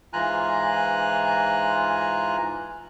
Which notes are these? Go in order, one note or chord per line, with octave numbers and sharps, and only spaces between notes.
G#2 E3 F4 G#5 A#5 F#6